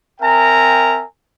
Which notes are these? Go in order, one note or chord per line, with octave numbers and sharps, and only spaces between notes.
C4 A#4 E5 G5 G#5 A#5